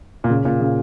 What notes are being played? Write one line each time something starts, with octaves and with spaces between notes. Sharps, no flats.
A#2
C#3
A#2
C#3